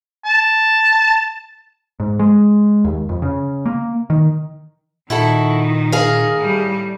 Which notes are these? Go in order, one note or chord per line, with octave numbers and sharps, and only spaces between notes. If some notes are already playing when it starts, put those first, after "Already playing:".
A5
G#2
G#3
D#2
F2
C#3
A#3
D#3
A#2 D#3 E4 F#4 A4
G#4 A#4 F5
A2 G3